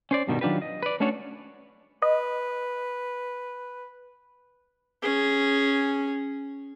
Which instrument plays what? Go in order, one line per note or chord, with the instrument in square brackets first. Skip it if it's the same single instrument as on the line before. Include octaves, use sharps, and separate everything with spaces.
[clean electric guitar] C#4 C5 D5
G2 B2 D#3 G3
D#3 F#3 D4 F4 G4 B4
D#5
B4 D5
A3 C#4 D4 F#4 A4 C#5
[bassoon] B4 [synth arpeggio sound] D#5
[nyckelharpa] C#4 G#4